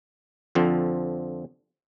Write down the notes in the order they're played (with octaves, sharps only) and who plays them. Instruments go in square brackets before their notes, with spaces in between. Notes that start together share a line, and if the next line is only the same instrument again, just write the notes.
[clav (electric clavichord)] F2 D3 F3 C4